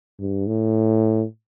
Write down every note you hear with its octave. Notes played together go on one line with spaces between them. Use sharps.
G2
A2